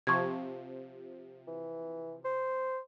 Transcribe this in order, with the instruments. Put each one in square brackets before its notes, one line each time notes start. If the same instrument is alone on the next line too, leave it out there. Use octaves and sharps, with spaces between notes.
[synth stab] C3 F3 [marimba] C#6 G#6
[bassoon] E3
C5